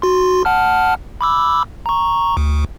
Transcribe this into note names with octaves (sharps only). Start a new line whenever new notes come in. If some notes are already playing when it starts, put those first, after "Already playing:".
F#4 C6
F#5 A5 F6
B5 D6 E6
A#5 C#6
D2